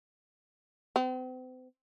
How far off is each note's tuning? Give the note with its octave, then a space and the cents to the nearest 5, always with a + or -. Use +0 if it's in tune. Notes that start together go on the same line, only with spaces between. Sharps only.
C4 -40